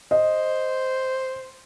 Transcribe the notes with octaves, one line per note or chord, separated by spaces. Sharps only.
C5 D#5